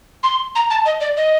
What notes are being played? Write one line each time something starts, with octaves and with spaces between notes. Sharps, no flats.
C6
A#5
A5
D#5
D5
D#5